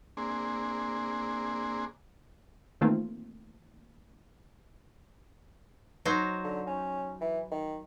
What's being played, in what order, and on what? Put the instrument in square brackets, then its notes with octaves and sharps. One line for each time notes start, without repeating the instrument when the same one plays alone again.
[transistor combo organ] A#3 C4 D4 G#4
[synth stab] D#3 E3 A3 A#3 C4 F4
[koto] F#3 D#4 C5
[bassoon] D3
C#4
E3
D#3